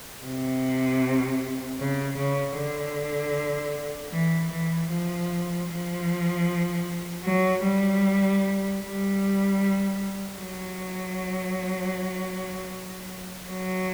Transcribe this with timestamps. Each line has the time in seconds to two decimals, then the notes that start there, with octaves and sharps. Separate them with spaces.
0.24 C3
1.79 C#3
2.17 C#3
2.57 D3
4.12 E3
4.51 E3
4.90 F3
5.69 F3
7.24 F#3
7.63 G3
8.80 G3
10.36 F#3
13.47 F#3